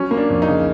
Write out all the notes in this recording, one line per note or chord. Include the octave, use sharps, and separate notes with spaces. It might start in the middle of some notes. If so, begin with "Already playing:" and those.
Already playing: F#3 C#4
A#3
D4
F2
D#4
C#3